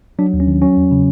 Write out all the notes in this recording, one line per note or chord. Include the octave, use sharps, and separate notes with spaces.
F#3 D4
D#2
C#4
D#3
F#3 C#4
E2
C#3